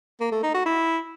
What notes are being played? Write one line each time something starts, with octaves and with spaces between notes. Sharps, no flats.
A#3
A3
D#4
F#4
E4